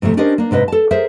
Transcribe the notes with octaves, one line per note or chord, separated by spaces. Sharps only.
G#2 C3 F3 A3
C#4 D4 G4 A#4 C5 D#5
A#3 D4
G#2 C3 B4 D#5
A4 A5
G#4 A#4 C5 E5